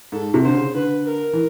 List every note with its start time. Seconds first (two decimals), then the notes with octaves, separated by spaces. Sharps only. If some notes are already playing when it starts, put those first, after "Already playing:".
0.12 G#2 A4
0.34 C3
0.44 D3 C5
0.55 C#3
0.74 D3 B4
1.06 A#4
1.33 E3